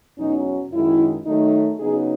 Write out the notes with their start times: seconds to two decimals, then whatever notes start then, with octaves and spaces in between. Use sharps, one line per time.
0.18 E2 B2 F#3 C#4 D#4
0.72 F#2 D#3 G#3 E4
1.26 D#3 F#3 A3 D#4
1.79 C#3 F#3 B3 D#4 G#4